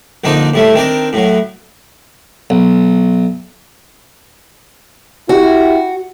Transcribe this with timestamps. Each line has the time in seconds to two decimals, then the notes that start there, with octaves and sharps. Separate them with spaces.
0.24 A#1 D3 C4 D#4 A#5
0.54 A2 G3 A3
0.74 D#3 C4 D4 A#4
1.13 A2 F#3
2.50 B1
5.29 E4 F#4 G4